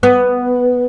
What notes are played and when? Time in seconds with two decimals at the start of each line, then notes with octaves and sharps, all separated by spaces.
0.03 B3